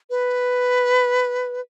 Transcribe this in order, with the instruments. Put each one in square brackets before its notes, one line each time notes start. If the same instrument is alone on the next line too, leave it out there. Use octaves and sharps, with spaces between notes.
[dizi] B4